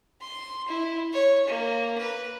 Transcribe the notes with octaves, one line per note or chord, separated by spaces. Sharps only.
C6
E4
C#5
A#3
B4